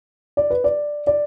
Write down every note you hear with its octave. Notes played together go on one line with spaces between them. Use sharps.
D5
B4
D5
D5